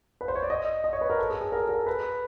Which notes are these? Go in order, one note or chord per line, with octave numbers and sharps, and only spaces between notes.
B4
C5
C#5
D5
D#5
D#5
C#5
B4
A#4
A4
G#4
G#4
A#4
A4
A#4
A4
B4